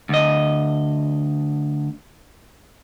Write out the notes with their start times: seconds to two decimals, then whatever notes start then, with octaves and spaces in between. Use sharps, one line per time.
0.09 D2 D#5